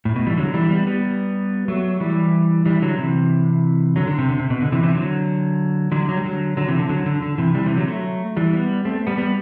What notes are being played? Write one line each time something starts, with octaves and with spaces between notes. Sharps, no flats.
A2
B2
E3 G3
D3 F#3
E3 G3
G3 B3
G3 B3
F#3 A3
E3 G3
E3 G3
D3 F#3
C3 E3
D3 F#3
D3
C3
D3
C3
B2
D3
C3 E3
C3 E3
D3 F#3
D3 F#3
F#3
G3
D3 F#3
D3 F#3
C3 E3
D3
D3 F#3
D3
D3
C3 E3
E3 G3
C3 E3
D3 F#3
F#3 A3
E3 G3
G3 B3
A3 C4
G3 B3
G3 B3